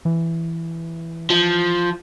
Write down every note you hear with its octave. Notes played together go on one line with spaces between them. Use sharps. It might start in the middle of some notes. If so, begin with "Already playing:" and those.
E3
F3